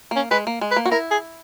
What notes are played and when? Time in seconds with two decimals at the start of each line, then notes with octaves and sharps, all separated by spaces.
0.11 A#3 C#4
0.31 G#3 B4
0.47 A#3
0.61 G#3
0.71 B4
0.76 A#3
0.86 F#4
0.91 E4 A#4
1.11 G#4